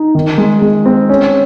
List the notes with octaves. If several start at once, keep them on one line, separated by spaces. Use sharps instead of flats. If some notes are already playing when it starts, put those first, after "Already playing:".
Already playing: D#4
D#3
G#3
G#3
C4
C#4